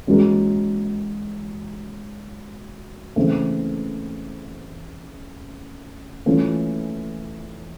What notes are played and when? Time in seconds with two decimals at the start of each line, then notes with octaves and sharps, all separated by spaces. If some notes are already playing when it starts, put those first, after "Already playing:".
0.07 E3 G#3 C#4 F#4 A#4
3.16 C#3 E3 A3 C4
6.26 E3 A3 C#4 F4